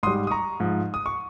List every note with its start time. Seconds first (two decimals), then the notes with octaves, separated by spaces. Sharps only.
0.03 G#2 G3 C6 D#6
0.27 D#6
0.31 A#5 C#6
0.60 G#2 F3
0.94 D#6
1.06 C#6